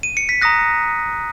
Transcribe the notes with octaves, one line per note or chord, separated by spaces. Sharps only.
D#7
C#7
B6
A#5 D#6 F#6 A#6